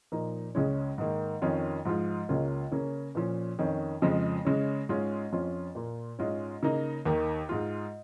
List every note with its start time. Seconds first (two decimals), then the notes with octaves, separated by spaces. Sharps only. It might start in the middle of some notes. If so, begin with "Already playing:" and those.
0.12 A#2 F3 A#3 D#4
0.55 C#2 C#3 G#3 C#4
0.98 G#2 D#3 A#3
1.42 F2 D#3 C#4 F4
1.85 G#2 F3 G#3 F4
2.29 C#2 C#3 A#3 C#4 F4
2.72 C#3 A#3 C#4
3.15 A#2 F3 C#4
3.59 F2 D#3 C#4
4.02 F2 C#3 F3 G#3
4.45 C#3 G#3 C#4
4.89 G#2 G#3 C#4 F4
5.32 F2 F3 C#4 F4
5.75 A#2 A#3 F4
6.19 G#2 G#3 C#4 F4
6.63 C#3 A#3 D#4
7.06 D#2 D#3 A#3
7.49 G#2 G#3 F4